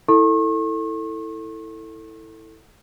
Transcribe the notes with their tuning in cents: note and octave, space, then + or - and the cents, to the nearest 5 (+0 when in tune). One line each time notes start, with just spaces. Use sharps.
E4 -10 A4 +15 C#6 -40